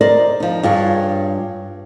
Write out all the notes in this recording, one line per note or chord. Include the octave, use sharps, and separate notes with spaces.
A#4 C5 D5 D#5
F3 D#4
G2 F4 G#4 C#5